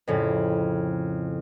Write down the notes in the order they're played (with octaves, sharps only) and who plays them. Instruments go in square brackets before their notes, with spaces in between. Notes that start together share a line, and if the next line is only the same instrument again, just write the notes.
[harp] F2 A2 C#3